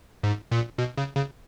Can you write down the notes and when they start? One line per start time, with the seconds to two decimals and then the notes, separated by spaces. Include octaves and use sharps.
0.23 G#2
0.51 A#2
0.78 B2
0.98 C#3
1.15 C#3